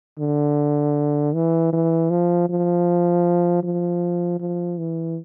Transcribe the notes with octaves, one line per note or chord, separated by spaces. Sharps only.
D3
E3
E3
F3
F3
F3
F3
E3